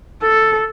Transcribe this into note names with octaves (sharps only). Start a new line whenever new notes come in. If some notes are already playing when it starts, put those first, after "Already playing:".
A4